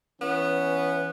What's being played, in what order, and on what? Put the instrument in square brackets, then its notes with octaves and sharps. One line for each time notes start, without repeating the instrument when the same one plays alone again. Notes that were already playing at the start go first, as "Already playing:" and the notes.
[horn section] E3 C#4 [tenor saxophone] B3